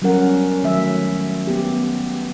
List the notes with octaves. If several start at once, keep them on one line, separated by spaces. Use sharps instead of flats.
F#3 G3 B3 C#4 A#4 F#5
D#3 F#3 A3 E5
B3 G4